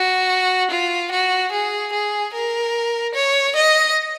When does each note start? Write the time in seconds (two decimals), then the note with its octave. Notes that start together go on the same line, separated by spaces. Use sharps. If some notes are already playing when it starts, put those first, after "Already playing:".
Already playing: F#4
0.71 F4
1.11 F#4
1.52 G#4
1.93 G#4
2.34 A#4
3.14 C#5
3.56 D#5